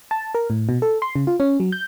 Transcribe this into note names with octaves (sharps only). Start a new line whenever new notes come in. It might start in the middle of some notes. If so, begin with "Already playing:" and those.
A5
A#4
A2
B2
A4
C6
C#3
F4
C#4
F#3
G6